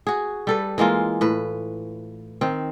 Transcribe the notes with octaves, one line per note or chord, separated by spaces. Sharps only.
F#4 G#4
G3 A4 B4
E3 G#3 A#3 F4
A2 B4
D#3 C4